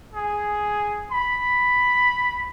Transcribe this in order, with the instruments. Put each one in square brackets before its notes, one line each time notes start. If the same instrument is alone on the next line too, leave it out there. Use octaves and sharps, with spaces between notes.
[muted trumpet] G#4
B5